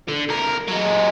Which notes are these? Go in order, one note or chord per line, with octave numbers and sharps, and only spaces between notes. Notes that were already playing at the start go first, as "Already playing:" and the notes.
D3
C#2 A#4
F#3 G#3